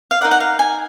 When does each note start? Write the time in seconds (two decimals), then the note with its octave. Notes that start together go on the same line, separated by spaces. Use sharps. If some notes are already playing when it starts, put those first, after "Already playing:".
0.11 F5
0.21 D#4 A#4 D5 F#5
0.31 F#5
0.40 F5
0.59 G#5